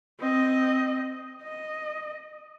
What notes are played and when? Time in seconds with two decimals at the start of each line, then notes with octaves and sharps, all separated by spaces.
0.20 C4 D#5
1.43 D#5